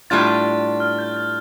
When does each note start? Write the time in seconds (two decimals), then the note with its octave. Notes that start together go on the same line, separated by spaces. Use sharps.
0.10 A2 G3 D4 F4 A6
0.80 F6
0.99 G6
1.17 A6